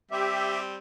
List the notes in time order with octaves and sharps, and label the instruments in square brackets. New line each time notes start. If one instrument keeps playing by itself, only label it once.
[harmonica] G3 C4 [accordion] G4 E5